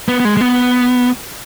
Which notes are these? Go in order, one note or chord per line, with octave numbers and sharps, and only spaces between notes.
B3
B3
G#3
G#3
B3